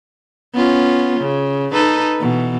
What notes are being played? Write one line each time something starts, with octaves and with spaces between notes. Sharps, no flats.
B3 C#4 F4
C#3
D#4 A4 B4
B2 E3